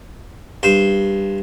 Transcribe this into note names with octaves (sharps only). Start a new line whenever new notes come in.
G2 C5